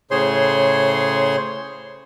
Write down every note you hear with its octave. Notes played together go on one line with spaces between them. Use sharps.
A2 C#3 G#4 C5 C#5 C6